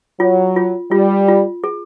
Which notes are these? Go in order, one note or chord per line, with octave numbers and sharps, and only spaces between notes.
F#3 F4
F4
G3 F4
F4
G#4